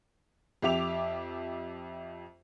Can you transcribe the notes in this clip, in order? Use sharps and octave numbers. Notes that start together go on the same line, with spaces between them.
F2 G4 E5 D6 F7